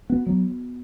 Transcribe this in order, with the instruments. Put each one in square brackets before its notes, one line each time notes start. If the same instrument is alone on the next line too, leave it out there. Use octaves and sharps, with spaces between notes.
[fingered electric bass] B3 [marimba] F#4
[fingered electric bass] F#3 [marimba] B3